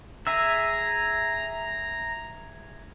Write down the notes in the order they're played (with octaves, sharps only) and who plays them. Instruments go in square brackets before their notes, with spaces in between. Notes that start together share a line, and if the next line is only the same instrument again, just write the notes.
[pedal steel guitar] G#4 E5 E6 [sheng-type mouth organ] A#5